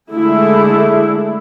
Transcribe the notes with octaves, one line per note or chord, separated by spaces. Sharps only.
D3 G#3 A3 E4 G#4